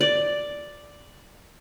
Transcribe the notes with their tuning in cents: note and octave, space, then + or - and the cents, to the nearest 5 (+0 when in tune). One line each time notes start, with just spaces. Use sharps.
D5 +0